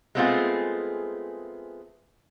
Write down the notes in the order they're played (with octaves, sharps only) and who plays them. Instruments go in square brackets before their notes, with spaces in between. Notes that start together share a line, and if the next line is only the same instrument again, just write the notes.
[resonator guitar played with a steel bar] G#3 A3 B3 C4 F4 G#4